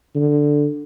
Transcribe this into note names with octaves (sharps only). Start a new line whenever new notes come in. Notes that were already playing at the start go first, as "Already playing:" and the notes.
D3